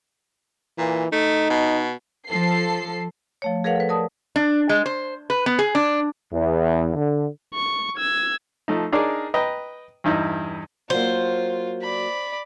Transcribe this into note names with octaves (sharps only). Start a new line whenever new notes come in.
A#2 E3
A3 D#4
B2
F3 A4 C7
F3 A3 C#5
G#4 A#4 B4 C#5 F5 F#5
A4 B4
A#4 D5 A5 D#6
D4
G#3
C5
B4
B3
G#4
D4
E2
D3
C#6
E6 G#6
F3 A3 D#4
D4 D#4 G#4 A#4 C#5 D5
B4 D#5 G5 A#5
E2 G2 D#4 E4
F#3 A#3 F4 C5
D5 B5